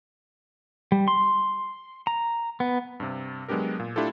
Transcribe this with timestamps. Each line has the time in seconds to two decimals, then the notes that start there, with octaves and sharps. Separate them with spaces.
0.92 G3
1.08 C6
2.07 A#5
2.60 B3
3.00 G2 C3
3.48 F#3 G#3 B3 D4 G4 A#4
3.80 A#2
3.96 A3 D4 E4 F4 G4 A4